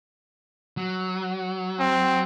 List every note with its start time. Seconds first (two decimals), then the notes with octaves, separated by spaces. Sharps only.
0.77 F#3
1.80 C4